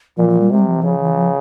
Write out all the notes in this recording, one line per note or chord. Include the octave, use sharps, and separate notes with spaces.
A#2 F3
F3
G3
C3 G#3
G3
F3
E3
C#3 F3
E3
F3